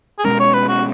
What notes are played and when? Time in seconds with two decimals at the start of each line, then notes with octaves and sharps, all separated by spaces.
0.18 G#4
0.24 B2 G#3 C#4 A#4
0.39 C#5
0.54 B4
0.68 F#4